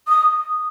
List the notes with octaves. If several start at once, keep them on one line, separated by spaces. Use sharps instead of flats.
D#6